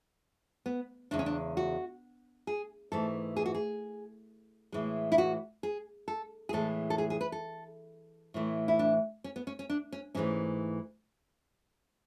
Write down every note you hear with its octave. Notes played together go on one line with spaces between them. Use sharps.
B3
E2 C#3 G#3 D4
C#4
D4
F#4
G#4
G#2 E3 A3 A4
G#4
F#4
G#4
A2 E3 G#3
E4
F#4
G#4
A4
G#4
A2 E3 G#3 A4
A4
G#4
G#4
B4
A4
A2 E3 A3
E4
D4
C#4
B3
C#4
C#4
D4
C#4
G#2 E3 A3 C#4